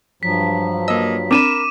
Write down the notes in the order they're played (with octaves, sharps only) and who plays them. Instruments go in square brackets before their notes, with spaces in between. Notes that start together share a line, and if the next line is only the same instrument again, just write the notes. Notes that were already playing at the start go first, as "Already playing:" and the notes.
[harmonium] G2 F3 F#3 [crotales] B6
[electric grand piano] A#3 D#5 [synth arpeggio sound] E6
[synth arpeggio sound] C4 D4 [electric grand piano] A#4 B5 [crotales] D6 D#7 E7